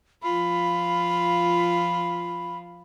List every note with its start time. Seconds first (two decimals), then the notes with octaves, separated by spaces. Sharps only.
0.23 F3 F4 B5